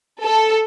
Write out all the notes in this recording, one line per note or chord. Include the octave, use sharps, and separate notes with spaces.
A4